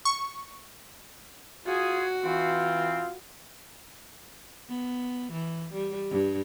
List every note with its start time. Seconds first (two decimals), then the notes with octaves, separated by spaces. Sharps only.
0.05 C#6
1.66 F4 F#4 G#4
2.24 E3 C4 F4
4.69 B3
5.32 E3
5.73 G3
6.11 G2